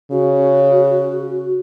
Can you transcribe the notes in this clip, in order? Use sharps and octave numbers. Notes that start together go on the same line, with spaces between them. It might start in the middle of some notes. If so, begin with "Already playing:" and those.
C#3 F#4